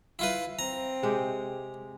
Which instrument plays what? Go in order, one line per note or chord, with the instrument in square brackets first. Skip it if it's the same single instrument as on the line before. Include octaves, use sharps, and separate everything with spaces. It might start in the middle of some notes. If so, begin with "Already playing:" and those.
[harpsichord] E4 F4 B4
[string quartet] C4 [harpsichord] A#5
[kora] C3 G#3 G4